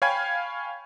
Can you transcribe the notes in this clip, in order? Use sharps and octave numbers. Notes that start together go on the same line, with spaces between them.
C#5 F5 G5 G#5 B5 G#6